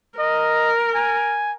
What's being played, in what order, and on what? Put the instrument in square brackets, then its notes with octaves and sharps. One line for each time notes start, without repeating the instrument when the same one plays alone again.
[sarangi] A#4 [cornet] D#5
[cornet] G#5